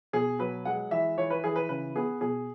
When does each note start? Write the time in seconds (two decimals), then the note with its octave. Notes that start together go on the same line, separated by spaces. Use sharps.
0.13 B2 G#4
0.39 F#3 B4
0.65 G#3 F#5
0.91 E3 E5
1.17 E3 C#5
1.30 B4
1.44 E3 G#4
1.56 B4
1.69 C#3 B4
1.95 B3 G#4
2.21 B2 G#4